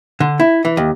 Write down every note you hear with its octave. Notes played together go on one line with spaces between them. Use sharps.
D3
E4
E3
D#2